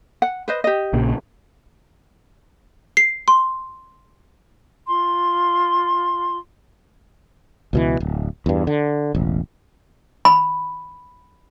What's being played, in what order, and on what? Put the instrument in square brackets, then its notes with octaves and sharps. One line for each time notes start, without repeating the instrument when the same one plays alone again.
[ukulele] F#5
B4 C5 D#5
G4 D#5
[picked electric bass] A#1 A#2 C#3
[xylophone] C7
C6
[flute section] F4 C6
[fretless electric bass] C#2 B2 E3
D1
E2 G2
D3
E1 A1
[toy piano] B5